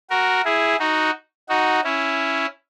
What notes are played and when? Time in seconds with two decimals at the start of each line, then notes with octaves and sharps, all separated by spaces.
0.10 F#4 A#4
0.45 E4 G#4
0.79 D#4 F#4
1.49 D#4 F#4
1.84 C#4 E4